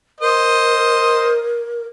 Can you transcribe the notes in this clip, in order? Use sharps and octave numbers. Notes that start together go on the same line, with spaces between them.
A#4 C5 D#5